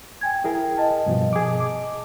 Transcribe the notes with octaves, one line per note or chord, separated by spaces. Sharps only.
G5 G#5 G#6
E4 G#4 A#4
D#5 A5
G2 B2 F3
G#4 D6
D6